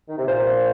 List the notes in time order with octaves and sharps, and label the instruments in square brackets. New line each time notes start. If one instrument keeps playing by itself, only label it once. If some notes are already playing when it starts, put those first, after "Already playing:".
[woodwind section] D#3
C3
[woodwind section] A#2 [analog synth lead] C5